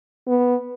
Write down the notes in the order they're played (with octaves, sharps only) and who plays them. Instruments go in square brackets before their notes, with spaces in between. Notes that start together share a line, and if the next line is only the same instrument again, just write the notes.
[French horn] B3